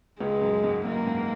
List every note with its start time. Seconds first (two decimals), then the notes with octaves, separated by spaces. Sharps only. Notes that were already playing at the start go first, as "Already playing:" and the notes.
0.20 C#2 C#3 G#3
0.42 F#2
0.64 G#2
0.85 F#2 A#3
1.07 G#2